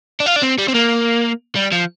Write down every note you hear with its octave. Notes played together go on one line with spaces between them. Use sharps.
D4
F4
D4
C4
G3
C4
A#3
G3
F3